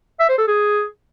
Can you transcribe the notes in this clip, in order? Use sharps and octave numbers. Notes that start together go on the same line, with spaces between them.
E5
C5
A4
G#4